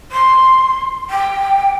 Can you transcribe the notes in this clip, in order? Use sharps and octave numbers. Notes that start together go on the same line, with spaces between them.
C6
G5